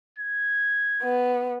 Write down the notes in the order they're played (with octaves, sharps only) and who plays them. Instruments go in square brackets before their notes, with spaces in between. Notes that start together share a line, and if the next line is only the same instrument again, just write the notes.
[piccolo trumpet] G#6
[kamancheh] B3